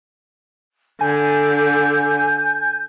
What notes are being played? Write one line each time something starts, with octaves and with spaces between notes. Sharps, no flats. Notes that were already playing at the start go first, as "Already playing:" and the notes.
D3 G#5 G6